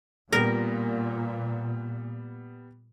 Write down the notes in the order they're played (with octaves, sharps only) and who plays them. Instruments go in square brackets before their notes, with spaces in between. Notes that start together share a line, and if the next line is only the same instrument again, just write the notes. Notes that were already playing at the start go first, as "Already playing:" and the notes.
[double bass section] A#2 [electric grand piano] G3 B3 A#6 [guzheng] A#4